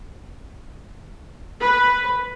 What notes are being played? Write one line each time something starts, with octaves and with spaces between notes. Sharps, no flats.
B4